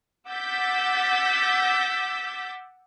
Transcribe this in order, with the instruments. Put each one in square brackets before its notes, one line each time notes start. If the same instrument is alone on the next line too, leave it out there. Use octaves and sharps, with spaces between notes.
[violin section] F#5 D6 E6 G6 A6 B6